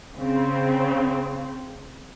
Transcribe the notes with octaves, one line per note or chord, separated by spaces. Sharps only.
C#3 C4